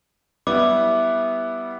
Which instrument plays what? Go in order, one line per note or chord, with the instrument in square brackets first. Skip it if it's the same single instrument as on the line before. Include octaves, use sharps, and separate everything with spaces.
[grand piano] G3 B3 E4 [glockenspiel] D6